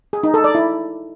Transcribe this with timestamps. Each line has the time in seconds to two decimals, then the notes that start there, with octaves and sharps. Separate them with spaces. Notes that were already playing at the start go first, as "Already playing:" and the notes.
0.13 G#4
0.23 D#4
0.34 A4
0.44 D5
0.55 E4